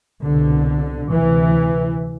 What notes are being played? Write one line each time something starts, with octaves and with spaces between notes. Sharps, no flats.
C2 B2 D3
D2 C3 E3